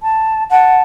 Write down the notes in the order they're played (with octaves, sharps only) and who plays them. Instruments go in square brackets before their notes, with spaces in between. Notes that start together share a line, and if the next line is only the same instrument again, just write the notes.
[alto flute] A5
[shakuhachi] F#5 [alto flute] A5